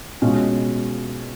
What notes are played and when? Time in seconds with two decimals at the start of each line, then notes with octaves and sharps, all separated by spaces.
0.22 B2 G#3 C#4 F4